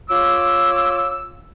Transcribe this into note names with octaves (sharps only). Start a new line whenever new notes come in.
F4 C#5 D6 E6